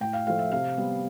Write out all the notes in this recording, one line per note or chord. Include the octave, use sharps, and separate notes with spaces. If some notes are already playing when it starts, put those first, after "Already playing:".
A2 G5
F5
F3 A3 F5
E5
C3 F5
G3 B3